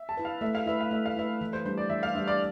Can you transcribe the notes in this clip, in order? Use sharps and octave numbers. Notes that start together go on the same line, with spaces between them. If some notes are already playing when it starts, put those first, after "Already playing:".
Already playing: E5
A5
E4 B4
F5
A3 E5
F5
E4 B4 E5
F5
A3 E5
F5
E4 B4 E5
E3
C5
G3 D4 C5
D5
E3 E5
F5
G3 D4 E5
D5